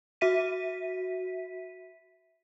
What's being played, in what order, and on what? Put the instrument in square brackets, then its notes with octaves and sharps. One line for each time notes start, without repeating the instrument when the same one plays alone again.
[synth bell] F#4 E5 B6 D#7